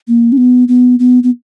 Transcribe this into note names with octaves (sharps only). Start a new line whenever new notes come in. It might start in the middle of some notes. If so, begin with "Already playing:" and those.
A#3
C#4
B3
B3
B3
B3